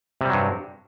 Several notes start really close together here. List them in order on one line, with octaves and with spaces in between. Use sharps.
C3 G3 F#3 G2